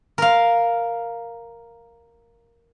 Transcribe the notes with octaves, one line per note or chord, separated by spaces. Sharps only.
A#4 F5